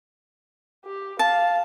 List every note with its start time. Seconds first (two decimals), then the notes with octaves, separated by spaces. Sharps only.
0.85 G4
1.19 F5 A5